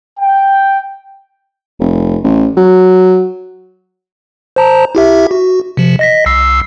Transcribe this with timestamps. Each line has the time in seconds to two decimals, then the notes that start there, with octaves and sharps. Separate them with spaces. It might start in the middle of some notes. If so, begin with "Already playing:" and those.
0.19 G5
1.80 F1
2.24 A1
2.56 F#3
4.56 C5 A5 A#5
4.95 E4 G4 E5
5.31 F#4
5.77 C3 F3
5.99 D#5 A#6 B6
6.26 C2 E6 C7